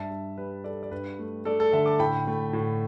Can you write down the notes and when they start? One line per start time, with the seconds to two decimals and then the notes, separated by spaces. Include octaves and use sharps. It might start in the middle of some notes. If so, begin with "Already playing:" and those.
Already playing: G2 E5 A5
0.10 G2
0.38 G3 B4
0.64 G3 A4 D5
0.83 D5
0.91 G2 B4
1.19 A3
1.45 A3 A4 D5
1.60 A4
1.72 D3 E5 A5
1.86 A5 D6
1.99 A2 G5 B5
2.27 A3
2.53 A2